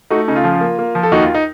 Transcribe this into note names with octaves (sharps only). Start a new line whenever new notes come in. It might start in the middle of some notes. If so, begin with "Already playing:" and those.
A3 D#4 F#4
C#3 D#4
F4
F3
A#3
A#3
F3
A4
D#2 D#4 F#4
F4
D#4